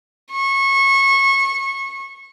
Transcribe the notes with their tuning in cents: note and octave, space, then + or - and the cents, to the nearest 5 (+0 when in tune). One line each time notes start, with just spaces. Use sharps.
C#6 -25